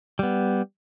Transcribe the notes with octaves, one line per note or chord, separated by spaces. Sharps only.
G3 B3